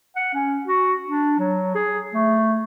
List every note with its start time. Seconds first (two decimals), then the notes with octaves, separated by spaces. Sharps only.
0.16 F#5
0.34 C#4
0.67 F#4
1.08 D4
1.39 F#3
1.75 G#4
2.14 A3